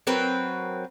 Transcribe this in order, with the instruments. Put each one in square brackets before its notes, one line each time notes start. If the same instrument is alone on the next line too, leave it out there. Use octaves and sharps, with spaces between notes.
[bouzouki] F#3 C4 A#4 B4